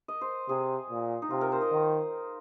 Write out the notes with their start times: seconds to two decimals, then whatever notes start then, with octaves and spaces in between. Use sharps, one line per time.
0.08 D#5
0.21 C5
0.48 C3 G#4
0.90 A#2
1.22 D#4
1.30 C3 F4
1.41 A#4
1.52 C5
1.61 D#5
1.72 D#3